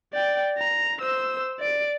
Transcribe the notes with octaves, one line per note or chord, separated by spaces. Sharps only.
D5 G5
A#5
C5 E6
D5 D7